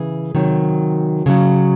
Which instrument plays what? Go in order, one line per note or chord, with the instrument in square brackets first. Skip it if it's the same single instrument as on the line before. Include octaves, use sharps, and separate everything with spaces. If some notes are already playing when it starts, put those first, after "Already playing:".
Already playing: [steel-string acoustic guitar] C#3 E3 G#4
C3 D#3 F#3
C#3 F#3